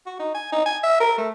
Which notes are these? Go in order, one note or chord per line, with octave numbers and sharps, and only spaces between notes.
F#4
D#4
G#5
D#4
G#5
E5
A#4
A3